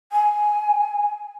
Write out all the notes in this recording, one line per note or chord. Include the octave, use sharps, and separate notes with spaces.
G#5